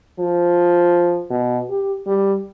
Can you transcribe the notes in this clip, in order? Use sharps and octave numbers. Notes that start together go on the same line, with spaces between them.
F3
B2
G4
G3